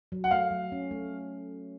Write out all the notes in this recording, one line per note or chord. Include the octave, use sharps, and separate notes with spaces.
F#3
F#5
A3 F5
F#3
C#4
A3